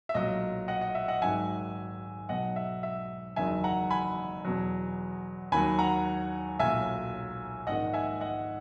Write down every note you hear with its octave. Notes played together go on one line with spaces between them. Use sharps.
E5
B1 A#2 F#3 D#5
D#5 F#5
D#5
E5
D#5 F#5
G#1 G#2 D#3 F#3 E5 G#5
B1 B2 F#3 D#5 F#5
E5
E5
F#1 E2 D#3 F#3 E5 G#5
F#5 A#5
G#5 B5
E2 B2 F#3
D#2 D#3 F#3 G#5 B5
F#5 A#5
B1 A#2 F#3 E5 G#5
A#1 G#2 D#3 D#5 F#5
E5 G#5
D#5 F#5